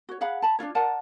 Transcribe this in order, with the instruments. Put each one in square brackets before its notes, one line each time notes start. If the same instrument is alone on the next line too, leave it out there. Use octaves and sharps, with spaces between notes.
[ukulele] F#4 C#5
G#4 F5 F#5 B5
A5 B5
D4 D#4 F4 C#5
A#4 D5 F#5 A5